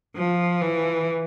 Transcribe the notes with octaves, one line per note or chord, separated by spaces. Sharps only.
F3
E3